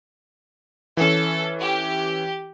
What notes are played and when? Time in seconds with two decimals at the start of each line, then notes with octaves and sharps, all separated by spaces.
0.97 E3 C#4 A4
1.60 G4